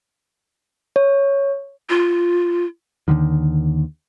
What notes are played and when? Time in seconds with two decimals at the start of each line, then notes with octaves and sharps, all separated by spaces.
0.96 C#5
1.89 F4
3.08 D#2 B2 D3 D#3